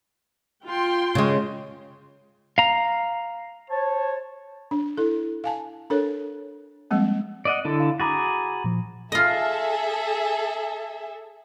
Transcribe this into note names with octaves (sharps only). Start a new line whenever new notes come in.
F4 G5 C6
C#3 G#3
F5 A#5
C5 C#5 A5
D4
E4 A4
F5 G#5 A5
D4 A4 A#4 C#5
F3 G3 G#3 A#3 C4
D5 D#5 F#5
D3 E4 A4
F5
F#4 G#4 A#5 B5 D6 A6
A#2 F3
F4 G#4 A4 D#5 E5